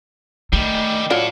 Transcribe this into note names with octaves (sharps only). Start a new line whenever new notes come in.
D#3 G3 A3
F#3 E4 F4 A4 D5